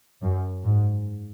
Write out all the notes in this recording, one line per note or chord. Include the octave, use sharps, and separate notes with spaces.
F#2
G#2